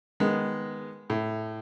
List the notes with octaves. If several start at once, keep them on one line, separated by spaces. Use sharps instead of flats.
D#3 G#3 B3
A2